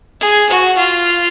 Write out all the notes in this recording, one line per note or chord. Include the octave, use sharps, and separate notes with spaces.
G#4
F#4
F4